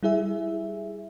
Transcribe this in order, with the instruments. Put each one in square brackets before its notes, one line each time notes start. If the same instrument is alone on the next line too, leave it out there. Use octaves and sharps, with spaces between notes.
[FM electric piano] G3 E4 G#4 E5